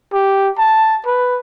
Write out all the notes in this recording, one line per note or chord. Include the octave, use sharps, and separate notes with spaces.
G4
A5
B4